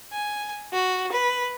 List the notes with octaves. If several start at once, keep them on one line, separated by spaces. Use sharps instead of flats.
G#5
F#4
B4